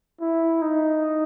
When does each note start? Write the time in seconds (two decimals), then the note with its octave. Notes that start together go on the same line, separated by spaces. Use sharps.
0.21 E4
0.62 D#4